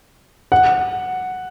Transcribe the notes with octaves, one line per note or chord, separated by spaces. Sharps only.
F#5